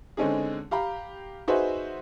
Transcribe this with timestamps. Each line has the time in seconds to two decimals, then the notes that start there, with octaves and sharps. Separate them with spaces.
0.17 D3 G#3 C4 C#4 D#4 G#4
0.71 G4 F5 A#5 B5
1.48 D#4 F#4 G#4 B4 C5 E5